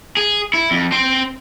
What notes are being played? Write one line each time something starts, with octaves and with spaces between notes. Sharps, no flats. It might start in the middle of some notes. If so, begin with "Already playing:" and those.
G#4
E4
F2
C4 C5